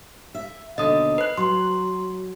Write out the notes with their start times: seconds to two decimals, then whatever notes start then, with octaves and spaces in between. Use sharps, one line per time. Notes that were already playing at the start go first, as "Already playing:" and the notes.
0.35 E5
0.78 D#2 B2 D3 D#5 D#6
1.18 B4 F#6
1.37 F#3 C6